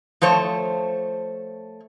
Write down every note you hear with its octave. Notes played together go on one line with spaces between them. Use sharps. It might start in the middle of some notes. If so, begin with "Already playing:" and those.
F3 A3 C5 C#5